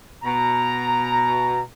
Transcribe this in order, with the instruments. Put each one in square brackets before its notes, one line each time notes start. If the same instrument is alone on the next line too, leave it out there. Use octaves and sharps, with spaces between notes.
[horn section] B2 A#5